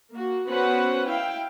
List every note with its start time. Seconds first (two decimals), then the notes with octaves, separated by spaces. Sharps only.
0.13 A#3 F#4
0.48 B3 C#4 F#4 B4 C5 F#5
1.06 E4 F5 G5